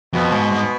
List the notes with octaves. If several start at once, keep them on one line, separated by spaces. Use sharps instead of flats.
F2 B2
G#2
G#2